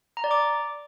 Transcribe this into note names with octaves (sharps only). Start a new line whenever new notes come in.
A#5
D5
D6